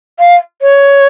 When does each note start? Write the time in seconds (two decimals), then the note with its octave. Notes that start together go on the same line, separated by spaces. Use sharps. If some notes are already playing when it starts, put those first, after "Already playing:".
0.19 F5
0.62 C#5